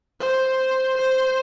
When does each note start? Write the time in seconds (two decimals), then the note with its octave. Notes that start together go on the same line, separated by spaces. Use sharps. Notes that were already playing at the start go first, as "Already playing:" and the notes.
0.20 C5
0.97 C5